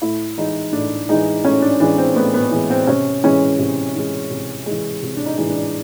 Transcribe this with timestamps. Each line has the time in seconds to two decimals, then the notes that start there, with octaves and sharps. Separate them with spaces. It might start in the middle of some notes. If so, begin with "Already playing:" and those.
0.02 A2 E4
0.38 E3 G#3 D#4
0.73 A2 D4
1.09 E3 G#3 D#4
1.44 A2 C#4
1.62 D4
1.80 E3 G#3 D4
1.98 C4
2.16 A2 B3
2.34 B3
2.51 E3 G#3
2.70 C4
2.87 C3 C#4
3.24 E3 G#3 C#4
3.59 C3
3.95 E3 G#3
4.30 C3
4.66 E3 G#3
5.02 C3
5.17 D4
5.26 D#4
5.38 E3 G#3
5.50 D4